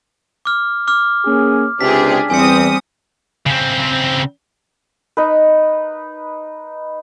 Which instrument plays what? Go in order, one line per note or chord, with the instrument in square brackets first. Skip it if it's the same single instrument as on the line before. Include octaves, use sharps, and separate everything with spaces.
[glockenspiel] D6 F6
D6 F6
[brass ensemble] A#3 C#4 G#4
[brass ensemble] C#2 C3 [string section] D4 G4 G#4 [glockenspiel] B6
[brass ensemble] E2 [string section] G3 C4 D#6 [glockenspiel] G#5 C#7
[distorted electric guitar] C#3 C4
[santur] D#4 B4